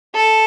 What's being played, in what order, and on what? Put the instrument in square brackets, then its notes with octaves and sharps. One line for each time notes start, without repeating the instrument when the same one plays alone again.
[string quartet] A4